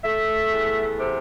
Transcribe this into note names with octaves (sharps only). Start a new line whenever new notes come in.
A3 E5
E2
C3